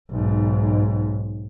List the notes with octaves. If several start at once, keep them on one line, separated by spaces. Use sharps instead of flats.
B1 G#2